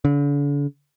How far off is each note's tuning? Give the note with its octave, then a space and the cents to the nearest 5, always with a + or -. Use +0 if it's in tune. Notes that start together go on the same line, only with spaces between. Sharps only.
D3 -40